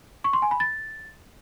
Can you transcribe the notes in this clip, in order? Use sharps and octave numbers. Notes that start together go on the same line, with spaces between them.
C#6
C6
G#5
B5
A6